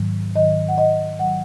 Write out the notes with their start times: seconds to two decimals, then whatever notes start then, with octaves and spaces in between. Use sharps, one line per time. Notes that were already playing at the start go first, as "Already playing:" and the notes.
Already playing: G#2 D#3 F#3
0.36 G#2 D#3 F#3 D#5
0.68 F#5
0.78 D#5
1.19 D#3 F#3 F#5